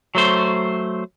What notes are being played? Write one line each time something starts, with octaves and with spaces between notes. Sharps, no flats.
F#3 A3 C5